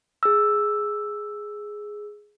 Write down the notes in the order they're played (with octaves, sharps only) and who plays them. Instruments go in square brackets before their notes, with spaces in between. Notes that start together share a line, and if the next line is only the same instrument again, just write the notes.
[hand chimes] G#4 E6